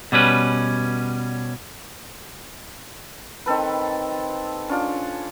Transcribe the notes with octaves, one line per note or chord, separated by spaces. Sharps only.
B2 G3 C#4 B4
D#3 C4 A4 B4
C#4 D4 F4